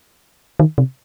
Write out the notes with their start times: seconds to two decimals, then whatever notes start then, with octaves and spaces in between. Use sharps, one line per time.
0.60 D#3
0.78 C3